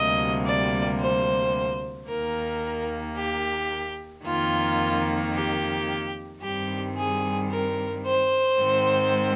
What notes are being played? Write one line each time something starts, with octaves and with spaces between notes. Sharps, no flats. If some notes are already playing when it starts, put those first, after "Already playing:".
Already playing: D2 C3 G3 A#3 D#5
D5
C5
D#2 D#3 A#3 A#4
G4
F2 D#3 A#3 F4
G4
G2 D#3 G3 C4 G4
G#4
A#4
C5
G#2 D#3 G#3 C4